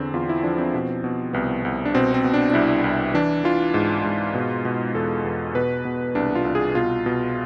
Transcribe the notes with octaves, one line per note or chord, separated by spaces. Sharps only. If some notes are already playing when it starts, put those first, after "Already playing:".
Already playing: E2 D3 C4
E2 F4
E4
F3 D4
C4
B2
B2
C2 B3
C2
D4
B2 C4
C4
B2
D4
D4
C2 E4
C2
E3 D4
E3 F4
G#2
G#2
B2
B2
E2 A4
E2
B2 B4
B2
C2 D4
F4
C2
G#4
B2 F4
B2